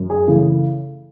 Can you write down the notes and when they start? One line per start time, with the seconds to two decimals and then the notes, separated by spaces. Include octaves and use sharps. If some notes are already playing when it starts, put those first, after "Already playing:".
Already playing: F#2
0.10 G#4
0.28 C#3 E3 A3